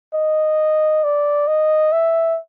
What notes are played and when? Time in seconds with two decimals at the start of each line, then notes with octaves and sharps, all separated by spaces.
0.14 D#5
1.04 D5
1.48 D#5
1.92 E5